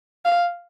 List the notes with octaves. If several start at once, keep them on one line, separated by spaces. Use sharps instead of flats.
F5